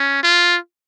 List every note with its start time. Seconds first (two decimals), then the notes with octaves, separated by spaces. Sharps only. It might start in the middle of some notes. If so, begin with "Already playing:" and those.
Already playing: C#4
0.23 F4